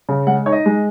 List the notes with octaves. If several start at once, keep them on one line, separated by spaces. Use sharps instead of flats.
C#3
G#3 F#5
D#4 C#5
D#5
G#3